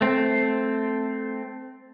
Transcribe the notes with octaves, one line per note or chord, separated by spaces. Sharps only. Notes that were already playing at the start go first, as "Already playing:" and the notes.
A3 C4